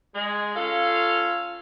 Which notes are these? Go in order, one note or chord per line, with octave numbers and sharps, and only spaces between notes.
G#3
C#4 F4 A4 F5